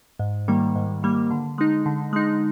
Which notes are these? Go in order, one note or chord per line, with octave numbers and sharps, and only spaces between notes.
G#2
D#3 G3 A#3
G#2
D#3 G3 A#3
D3
G#3 D#4
D3
G#3 D#4